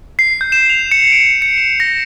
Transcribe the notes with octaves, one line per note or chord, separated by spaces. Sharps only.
C7
G6
E7
F7
C#7
D7
C#7
E7
A#6